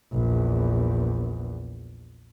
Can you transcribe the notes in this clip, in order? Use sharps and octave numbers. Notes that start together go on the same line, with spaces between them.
A#1 E2